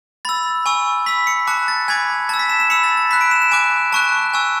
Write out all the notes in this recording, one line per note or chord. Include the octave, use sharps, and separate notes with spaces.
B5 E6 A6
G#5 C#6 E6
B5 E6 B6
C#7
A5 D6 F#6 C#7
A6
G#5 B5 D6 G#6
A5 E6 A6
B6
E7
E7
B5 E6 C#7
A6
A6
B5 F#6 B6
D7
E7
E7
G#5 D6 F#6 D7
A5 C#6 F#6
G#5 C#6 E6